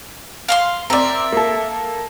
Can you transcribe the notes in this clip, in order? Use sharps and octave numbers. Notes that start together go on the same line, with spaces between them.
F5 A#5 C6
C4 A#4 D5 E5
A#3 A4